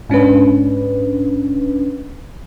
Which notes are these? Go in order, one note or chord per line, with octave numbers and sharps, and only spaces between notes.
G#2 C#4 D4 B4